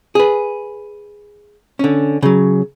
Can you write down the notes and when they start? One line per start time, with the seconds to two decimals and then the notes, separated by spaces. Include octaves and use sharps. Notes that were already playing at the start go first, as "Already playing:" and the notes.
0.15 G#4 B4
1.79 D3 C#4
2.22 C#3 F#3